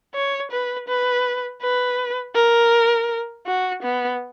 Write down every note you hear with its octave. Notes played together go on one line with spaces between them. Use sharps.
C#5
B4
B4
B4
A#4
F#4
B3